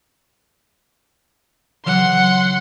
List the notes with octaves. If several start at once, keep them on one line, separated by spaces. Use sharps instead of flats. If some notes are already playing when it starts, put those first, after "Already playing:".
C#3 E3 F#3 F#5 C6